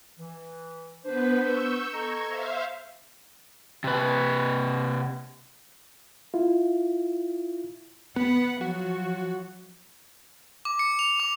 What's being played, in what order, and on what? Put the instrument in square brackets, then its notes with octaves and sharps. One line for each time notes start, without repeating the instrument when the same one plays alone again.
[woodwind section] E3
[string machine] B3 B4 [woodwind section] D4 C5
[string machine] C#6 E6 G6
[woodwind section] A4 D#5 A#5 [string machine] C#6 G#6
[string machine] C5 E5 F5
[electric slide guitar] C3 B4
[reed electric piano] E4 F4
[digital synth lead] B3 [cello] B4 F#5
[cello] F3 F#3 [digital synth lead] F#4
[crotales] D6
C#7
F7
D6